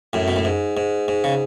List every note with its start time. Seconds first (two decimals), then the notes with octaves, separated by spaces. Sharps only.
0.13 F#2 A2
0.28 B2
0.36 A2
0.45 G#2
0.77 G#2
1.08 G#2
1.24 C#3